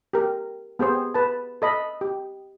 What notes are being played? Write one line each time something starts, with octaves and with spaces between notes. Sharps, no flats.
G4 A#4
B3 G4 G#4 C5
B4 A5
A4 D#5 B5
G4